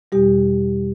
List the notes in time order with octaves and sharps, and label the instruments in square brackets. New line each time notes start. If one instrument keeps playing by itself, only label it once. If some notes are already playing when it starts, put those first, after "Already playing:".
[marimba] E2 B2 G3 G4